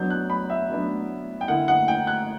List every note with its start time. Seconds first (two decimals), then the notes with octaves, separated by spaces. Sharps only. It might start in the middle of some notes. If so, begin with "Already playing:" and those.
Already playing: F#3 B3 D4 G6
0.10 F#6
0.30 B5
0.50 E5
0.69 F#3 B3 D4
1.41 G5
1.48 D3 A#3 E4 F#5
1.68 F#5
1.88 G5
2.07 F#6